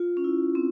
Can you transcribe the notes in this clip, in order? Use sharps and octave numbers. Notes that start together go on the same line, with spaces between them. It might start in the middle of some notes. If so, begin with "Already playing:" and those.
Already playing: F4
C#4
E4
C4